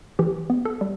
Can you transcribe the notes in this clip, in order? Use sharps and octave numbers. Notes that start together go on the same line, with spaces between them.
E3 G4
B3
A4
G3